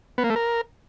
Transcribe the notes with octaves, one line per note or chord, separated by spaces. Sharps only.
B3
A#3
A3
A#4